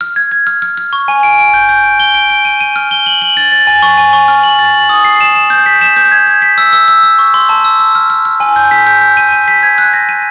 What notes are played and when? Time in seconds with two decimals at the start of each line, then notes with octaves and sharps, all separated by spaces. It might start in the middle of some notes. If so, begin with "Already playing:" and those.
0.01 F6
0.16 G#6
0.31 G#6
0.47 F6
0.62 F6
0.77 F6
0.93 C#6
1.08 G#5
1.23 D7
1.38 D7
1.54 G6
1.69 G6
1.84 D7
2.00 G7
2.15 D7
2.30 D7
2.45 D#7
2.61 D#7
2.76 F6
2.91 G7
3.06 F#7
3.22 F#7
3.37 A6
3.52 A6
3.67 G#5
3.82 C#6
3.98 G#5
4.13 C#6
4.28 F6
4.43 F#7
4.59 A6
4.74 F#7
4.89 D#6
5.04 C7
5.21 E7
5.35 E7
5.50 G6
5.66 B6
5.81 E7
5.96 G6
6.12 G#6
6.27 G#6
6.42 B6
6.58 E6
6.73 E6
6.88 E6
7.03 E6
7.19 C#6
7.34 C6
7.49 A5
7.65 E6
7.80 E6
7.95 F6
8.10 F6
8.25 F6
8.40 G#5
8.56 G6
8.71 B6
8.87 G6
9.01 G6
9.17 D#7
9.32 D#7
9.48 B6
9.63 G#6
9.78 F#6
9.93 A#6
10.09 D#7